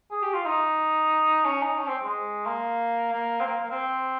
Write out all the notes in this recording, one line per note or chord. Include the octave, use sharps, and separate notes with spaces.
G#4
G4
F4
D#4
C#4
D#4
C#4
C4
G#3
A#3
A#3
C4
A#3
A#3
C4